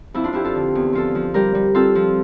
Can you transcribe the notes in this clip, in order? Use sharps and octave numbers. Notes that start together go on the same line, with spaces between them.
F2 E4
D4 F4
F2 E4 G4
F4 A4
D3
E2
F3 F4 A4
F3
G3 G4 A#4
G3
C4 F4 A4
F3